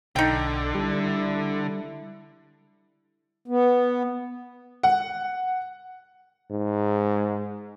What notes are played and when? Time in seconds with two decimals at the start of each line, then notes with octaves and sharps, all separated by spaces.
0.16 B1 D3 D#4 G5
0.75 G3 E4
3.48 B3
4.83 F#5
6.51 G#2